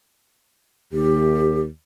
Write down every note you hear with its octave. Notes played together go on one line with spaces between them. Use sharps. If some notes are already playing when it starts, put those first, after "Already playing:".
D#2 G4